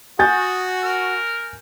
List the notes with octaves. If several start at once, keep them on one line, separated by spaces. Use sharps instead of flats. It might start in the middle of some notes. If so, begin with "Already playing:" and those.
F#4 G#5 D#6 G6 A6
A#4